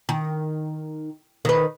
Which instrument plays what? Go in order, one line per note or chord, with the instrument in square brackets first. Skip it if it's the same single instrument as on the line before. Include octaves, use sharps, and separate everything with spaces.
[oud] D#3
D#3 B4